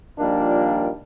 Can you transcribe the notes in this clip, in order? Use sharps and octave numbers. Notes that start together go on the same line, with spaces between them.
A#2 D#3 F3 G3 A#3 D4